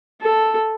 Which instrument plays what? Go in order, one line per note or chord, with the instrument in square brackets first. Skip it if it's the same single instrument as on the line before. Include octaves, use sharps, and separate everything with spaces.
[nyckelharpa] A4